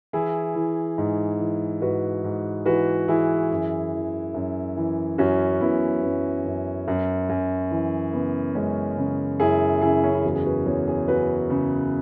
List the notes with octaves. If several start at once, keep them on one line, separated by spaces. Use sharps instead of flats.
E3 E4 G#4
E3
G#2
E3
G#2 F#4 B4
G#2
E3 F#4 B4
E3 E4 G#4
F#2
E3
F#2
E3
F#2 C#4 F#4
F#2 B3 E4
F#2 B3
F#2
F#2
F#2
E3
C#3 B3
F#2 G#3 C#4
C#3
F#2 E4 G#4
C#3 E4 G#4
C#4
E4
E2 F#4
G#4
F#4 B4
E2 G#4 C#5
G#4 C#5
C#3 F#4 B4
C#3